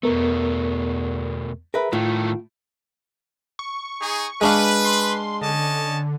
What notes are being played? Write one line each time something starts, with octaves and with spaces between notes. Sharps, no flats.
E2 B2 A3 B3 A#4
G#4 A#4 B4 E5
A2 D#3 A3 F4
C#6
D#4 G#4
G#3 D4 B4 F5
C6
D3 C#4 D#5 A5